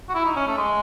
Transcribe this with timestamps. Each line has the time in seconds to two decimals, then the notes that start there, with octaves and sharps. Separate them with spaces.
0.09 F#4
0.15 E4
0.25 D#4
0.36 C#4
0.47 A3
0.57 G#3